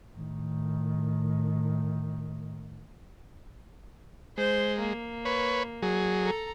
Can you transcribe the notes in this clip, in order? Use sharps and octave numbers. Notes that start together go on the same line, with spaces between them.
A2 D#3
G#3 C5
A#3
B4 C#5
F#3 G#4
A4 A#5